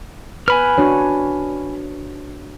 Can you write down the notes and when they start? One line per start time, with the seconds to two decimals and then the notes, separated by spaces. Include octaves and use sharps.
0.48 B4 G#5 B5 F6
0.78 D4 F#4 C#5